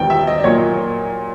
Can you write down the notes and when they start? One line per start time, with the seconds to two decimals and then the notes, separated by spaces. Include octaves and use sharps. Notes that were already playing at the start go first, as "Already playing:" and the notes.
Already playing: E1 D#2 D#3 G3 B3 G5
0.10 E5
0.27 D#5
0.38 D5
0.44 A#2 F#3 A#3 C#5